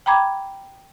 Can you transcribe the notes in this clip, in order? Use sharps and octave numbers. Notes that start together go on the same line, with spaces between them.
G5 A#5 B5 D6 G#6